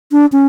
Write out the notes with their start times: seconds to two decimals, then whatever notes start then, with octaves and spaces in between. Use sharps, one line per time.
0.12 D4
0.32 C#4